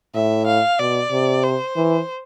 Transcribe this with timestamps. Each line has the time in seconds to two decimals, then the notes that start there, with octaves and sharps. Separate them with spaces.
0.15 A2 E5
0.47 F5
0.79 B2 D5
1.12 C3
1.44 C5
1.76 E3